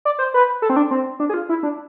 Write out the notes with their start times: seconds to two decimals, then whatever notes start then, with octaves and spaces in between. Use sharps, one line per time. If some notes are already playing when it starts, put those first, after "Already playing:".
0.05 D5
0.19 C5
0.34 B4
0.62 A4
0.70 C4
0.76 D4
0.91 C4
1.20 D4
1.30 G#4
1.34 F4
1.49 E4
1.63 D4